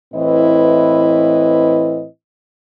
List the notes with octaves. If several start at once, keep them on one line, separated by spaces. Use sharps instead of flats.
A2 E3 C4 E4 B4 D#5